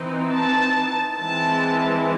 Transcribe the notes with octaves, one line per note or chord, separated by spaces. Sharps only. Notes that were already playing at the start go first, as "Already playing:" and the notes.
Already playing: E3 C4 D#4
A5
E3 G#3 C4 E4 A5